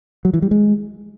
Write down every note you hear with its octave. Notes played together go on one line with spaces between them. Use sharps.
F#3
E3
G3
G#3